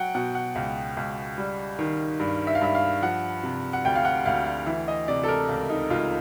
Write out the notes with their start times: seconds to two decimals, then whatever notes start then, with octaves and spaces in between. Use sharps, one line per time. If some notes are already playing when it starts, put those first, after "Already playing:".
Already playing: F#3 F#5 G5
0.15 B2 F#5
0.35 F#5
0.55 C#2
0.97 C#2
1.38 G3
1.79 D#3
2.19 G2
2.47 E5
2.55 F5
2.61 G2 E5
2.75 F5
3.02 F3 F#5
3.43 C3
3.73 F#5
3.85 D2 G5
3.96 F5
4.05 F#5
4.25 D2 F5
4.46 F5
4.66 E3 E5
4.88 D#5
5.08 C3 D5
5.23 A4
5.28 A#4
5.49 C#2
5.70 D#4
5.90 C#2 F4